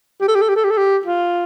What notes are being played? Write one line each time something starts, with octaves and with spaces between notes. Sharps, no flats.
G4
A4
G4
A4
G4
A4
G4
A4
G4
F4